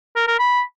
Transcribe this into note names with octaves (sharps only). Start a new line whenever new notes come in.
A#4
A#4
B5